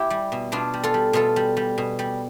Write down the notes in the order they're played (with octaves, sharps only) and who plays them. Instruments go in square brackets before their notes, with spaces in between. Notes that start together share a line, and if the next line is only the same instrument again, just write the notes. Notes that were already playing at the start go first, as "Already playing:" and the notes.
Already playing: [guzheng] E4 G4
G3
B2
B2 D4 F4
G3
F4 A4
G3
B2 F4 A4
G3
G3
B2
G3